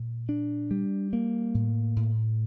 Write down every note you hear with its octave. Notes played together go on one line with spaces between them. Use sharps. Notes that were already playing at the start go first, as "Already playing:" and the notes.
Already playing: A#2
D4
G3
A#3
A2
A2